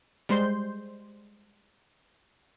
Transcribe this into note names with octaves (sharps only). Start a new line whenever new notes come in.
G3 G#3 C5 C6 G6